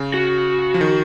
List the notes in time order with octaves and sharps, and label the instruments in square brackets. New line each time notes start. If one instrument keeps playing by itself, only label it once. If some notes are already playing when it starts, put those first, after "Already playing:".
Already playing: [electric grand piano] C#3
[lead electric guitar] F#4
[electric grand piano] F3
D#3